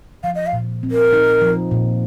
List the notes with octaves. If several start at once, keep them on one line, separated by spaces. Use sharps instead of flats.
F3 F5
D#5
F5
A#2
C4
A#4
D#4
F3
A#2